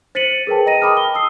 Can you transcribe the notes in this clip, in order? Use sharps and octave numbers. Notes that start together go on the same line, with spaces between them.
C5 A6 B6 C#7 D#7 F#7
G#4 A#4 B4 G5 A5
D#5 A#5 A#6 D#7
G5 A5 B5 D6 D#6 F6
G7
D#6 E6 C7